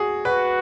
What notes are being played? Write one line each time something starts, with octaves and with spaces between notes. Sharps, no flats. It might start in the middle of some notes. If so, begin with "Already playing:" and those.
Already playing: F#4 G#4
F#4 B4